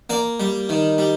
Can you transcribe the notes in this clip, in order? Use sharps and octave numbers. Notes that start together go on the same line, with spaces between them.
A#3 D5
G3
D#3
G3